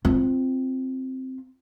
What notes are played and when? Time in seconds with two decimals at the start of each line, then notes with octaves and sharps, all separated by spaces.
0.05 C4 F4